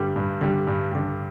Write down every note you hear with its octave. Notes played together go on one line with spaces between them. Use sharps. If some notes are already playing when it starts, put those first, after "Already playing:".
Already playing: G2 D3 G3
G2
D3 G3
G2
D3 G3